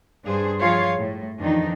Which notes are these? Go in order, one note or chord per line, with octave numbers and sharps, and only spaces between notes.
G2 D4 G#4 C5
F3 F4 G#4 C#5 F5
A2
F2 D#3 E3 D4 D#4